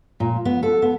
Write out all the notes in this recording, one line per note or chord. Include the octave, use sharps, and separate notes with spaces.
A#2
B3
A4
B3